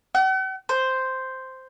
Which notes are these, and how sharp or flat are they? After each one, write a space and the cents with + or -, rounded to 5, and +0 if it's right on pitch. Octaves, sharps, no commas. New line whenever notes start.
F#5 +45
C5 -5